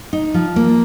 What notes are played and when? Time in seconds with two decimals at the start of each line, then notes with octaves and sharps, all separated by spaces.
0.13 D#4
0.34 F3
0.56 A#3